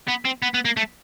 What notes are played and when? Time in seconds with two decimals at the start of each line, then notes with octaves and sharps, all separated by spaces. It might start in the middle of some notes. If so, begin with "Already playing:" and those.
0.08 B3
0.25 C4
0.42 B3
0.54 B3
0.65 A#3
0.77 A3